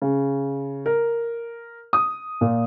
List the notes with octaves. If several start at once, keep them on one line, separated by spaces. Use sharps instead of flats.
C#3
A#4
D#6
A#2